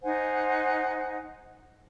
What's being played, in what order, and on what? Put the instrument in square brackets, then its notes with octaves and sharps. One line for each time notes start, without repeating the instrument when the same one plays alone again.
[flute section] D#4 C5 F#5 G#5